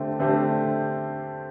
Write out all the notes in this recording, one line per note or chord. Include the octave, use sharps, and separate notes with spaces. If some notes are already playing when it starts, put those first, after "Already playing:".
Already playing: D3 A3 C4 G4
D3 A3 C4 G4 C5